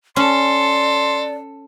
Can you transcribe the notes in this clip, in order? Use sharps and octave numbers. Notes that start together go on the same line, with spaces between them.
C#4 A4 D5 C6